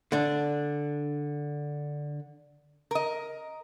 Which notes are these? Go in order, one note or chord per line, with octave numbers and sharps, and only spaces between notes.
D3 D4
A#4 D#5